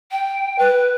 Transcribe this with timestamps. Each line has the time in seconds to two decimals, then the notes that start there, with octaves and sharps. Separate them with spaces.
0.11 G5
0.59 B4